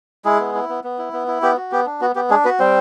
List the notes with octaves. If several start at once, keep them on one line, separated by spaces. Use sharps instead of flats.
G#3 E4 G#4
B3
E4
B3
B3
E4
B3
E4
B3 G4
F#4
B3 G4
D4
B3 F#4
B3 G4
G#3 D4 G#4
B3 F#4 B4
G3 C4 C5